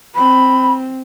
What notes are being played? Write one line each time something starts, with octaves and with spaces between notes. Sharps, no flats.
C4 B5